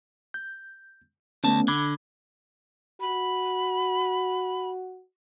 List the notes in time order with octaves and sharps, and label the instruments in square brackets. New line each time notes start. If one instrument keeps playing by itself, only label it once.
[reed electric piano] G6
[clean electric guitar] D2 A5 [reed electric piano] A3 B3 C#4
[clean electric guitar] D3 [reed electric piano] B5 D6 G#6
[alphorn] F#4 [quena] B5